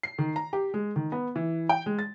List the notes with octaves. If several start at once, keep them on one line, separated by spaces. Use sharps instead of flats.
C7
D#3
A#5
G4
G#3
D#3
B3
E3
G5
G#3
A6